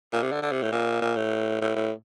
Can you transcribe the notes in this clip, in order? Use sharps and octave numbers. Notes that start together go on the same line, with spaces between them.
A#2
C3
D3
D3
C3
A2
A#2
A#2
A2
A2
A2